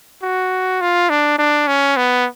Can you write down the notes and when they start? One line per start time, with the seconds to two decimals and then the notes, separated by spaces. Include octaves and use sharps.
0.22 F#4
0.81 F4
1.10 D4
1.38 D4
1.67 C#4
1.97 B3